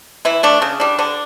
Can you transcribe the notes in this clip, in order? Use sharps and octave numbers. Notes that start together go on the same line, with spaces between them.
E3 E4
A3 D4
C#3
G3 D4
D3 D4